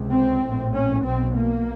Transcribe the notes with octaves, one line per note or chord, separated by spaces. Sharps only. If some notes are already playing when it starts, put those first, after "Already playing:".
Already playing: C#2 C3
C4
A#1 A2
C#4
B1 B2 C4
A#3